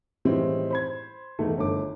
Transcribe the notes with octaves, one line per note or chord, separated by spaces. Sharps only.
A2 D#3 E3 G3 G#3 C4
C5 B5 G#6
E2 G#2 D#3 E3 A3
G1 D#3 A3 D4 D6